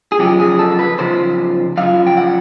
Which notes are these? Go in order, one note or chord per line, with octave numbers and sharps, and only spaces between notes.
G#4
F#2 C#3 F3 G4
G#4
A4
B4
F#2 C#3 F3 C5
F#2 C#3 F3 F5
G5
F#5